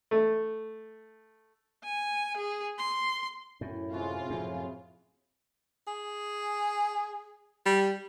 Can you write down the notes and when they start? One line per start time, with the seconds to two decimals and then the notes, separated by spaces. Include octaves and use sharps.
0.11 A3
1.84 G#5
2.37 G#4
2.78 C6
3.61 F#2 A2 C#4 E4
3.92 C3 G#3 F4 F#4 G#4
4.30 F#2 A2 F3
5.87 G#4
7.66 G3